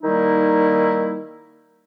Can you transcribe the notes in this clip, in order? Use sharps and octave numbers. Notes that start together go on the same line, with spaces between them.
D#3 G3 A#3 D#4 E4